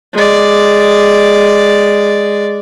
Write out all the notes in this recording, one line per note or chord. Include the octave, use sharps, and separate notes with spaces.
G#3 D5